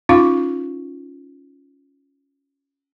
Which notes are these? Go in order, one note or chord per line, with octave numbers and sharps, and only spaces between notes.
C#4 D#4 F4 F5 C#6